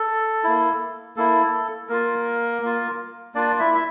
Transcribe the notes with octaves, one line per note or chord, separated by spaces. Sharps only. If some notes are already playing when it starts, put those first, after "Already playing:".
Already playing: A4
A#3 E4
A#3 E4 A4
A#3 F4 A#4
A#3 F4
A#3 D4 F4 D5
E4 E5
E5